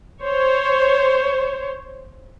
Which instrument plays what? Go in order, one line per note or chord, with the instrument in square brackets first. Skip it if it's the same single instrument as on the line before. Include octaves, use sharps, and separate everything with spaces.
[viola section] C5 C#5